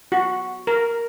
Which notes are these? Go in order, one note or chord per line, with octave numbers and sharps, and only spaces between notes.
F#4
A#4